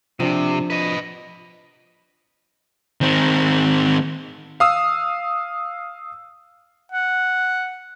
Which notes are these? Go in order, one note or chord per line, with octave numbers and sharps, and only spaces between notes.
C3 F3 D4
B4 D#5
D#3 C4
F5 D#6 E6
F#5